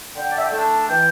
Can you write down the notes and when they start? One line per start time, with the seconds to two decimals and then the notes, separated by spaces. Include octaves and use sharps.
0.16 D3 G5
0.29 D5
0.37 E5
0.44 G5
0.52 A3 D4 A5
0.89 E3 G5